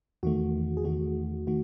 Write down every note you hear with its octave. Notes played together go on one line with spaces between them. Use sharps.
E2 D#3 A3 F#4
G#4
E2 D#3 A3 F#4
D#3 A3 F#4